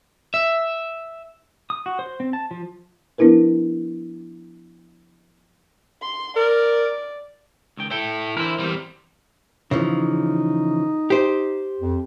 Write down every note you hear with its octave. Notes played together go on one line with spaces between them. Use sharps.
E5
D#6
F#4
C5
C4
A5
F3
F3 B3 D4 E4 A#4 B4
C6
A#4 D5
C#2 D#3 G5
E4 A4 G5
D3 E3 E4 A#4 C5
E2 E3 G3 C4
C#3 E3 F3 D#4
G4 C5
F2